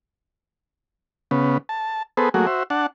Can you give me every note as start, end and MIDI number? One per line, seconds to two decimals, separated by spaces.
1.31 1.58 49
1.31 1.58 59
1.69 2.03 81
2.17 2.29 59
2.17 2.29 68
2.17 2.29 69
2.17 2.29 71
2.17 2.29 72
2.34 2.46 54
2.34 2.46 57
2.34 2.46 58
2.34 2.46 66
2.34 2.46 68
2.47 2.63 66
2.47 2.63 72
2.47 2.63 76
2.70 2.86 62
2.70 2.86 78
2.70 2.86 81